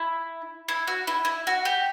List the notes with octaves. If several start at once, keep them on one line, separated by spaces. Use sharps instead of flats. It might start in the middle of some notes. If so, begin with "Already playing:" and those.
Already playing: E4
E4
F#4
E4
E4
F#4
G4